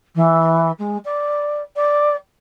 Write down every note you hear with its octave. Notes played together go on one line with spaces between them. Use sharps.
E3
G#3
D5
D5